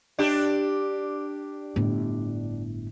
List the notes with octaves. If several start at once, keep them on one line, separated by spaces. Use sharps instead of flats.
D4 G4
G1 A2